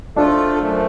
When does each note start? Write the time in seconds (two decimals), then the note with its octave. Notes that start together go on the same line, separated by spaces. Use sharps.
0.16 F3 A3 D4 F4 A4
0.58 F#2 F3 A3